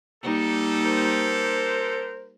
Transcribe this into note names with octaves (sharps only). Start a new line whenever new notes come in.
G3 A#3 D#4 G4 A4
A#4 C5